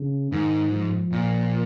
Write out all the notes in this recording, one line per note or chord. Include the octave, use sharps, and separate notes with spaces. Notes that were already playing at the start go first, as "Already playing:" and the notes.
Already playing: C#3
G#2 D#3
F3
A#2